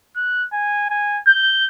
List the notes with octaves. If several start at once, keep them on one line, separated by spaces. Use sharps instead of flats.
F#6
G#5
G#5
G6